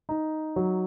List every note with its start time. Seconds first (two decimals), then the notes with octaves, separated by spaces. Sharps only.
0.09 D#4
0.56 F#3